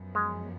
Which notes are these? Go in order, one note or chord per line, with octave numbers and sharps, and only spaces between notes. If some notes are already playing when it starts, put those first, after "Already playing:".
Already playing: F#2 F3 B3
G#3